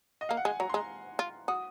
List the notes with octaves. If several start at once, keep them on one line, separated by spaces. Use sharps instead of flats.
D#5
A#3 F5
F#5
G#3 G#5
F#3 A#5
C6
G#3 A#5
F4
F#4 D#6